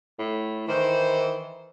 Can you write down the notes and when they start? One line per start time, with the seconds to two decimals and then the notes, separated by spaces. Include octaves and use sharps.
0.19 A2
0.68 D#3 E3 C5